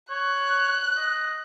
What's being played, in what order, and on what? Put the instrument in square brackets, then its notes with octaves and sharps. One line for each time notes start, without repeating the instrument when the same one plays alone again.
[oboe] C#5 [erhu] F#6
[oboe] D#5